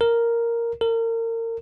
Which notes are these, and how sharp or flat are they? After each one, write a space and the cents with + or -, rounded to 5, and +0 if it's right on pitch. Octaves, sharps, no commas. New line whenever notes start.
A#4 +0
A#4 -30